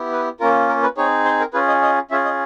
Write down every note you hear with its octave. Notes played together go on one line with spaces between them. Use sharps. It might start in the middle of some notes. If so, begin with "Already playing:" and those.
Already playing: B3 E4 G4
B4
A#3 C#4 F4 A#4
A#4
B4
C4 D#4 G#4 C#5
C5
A#4
C#4 F4 G#4 B4
D#5
D#5
C#4 F4 G#4 E5
D#5